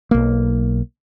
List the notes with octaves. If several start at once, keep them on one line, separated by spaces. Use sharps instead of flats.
B1 A#3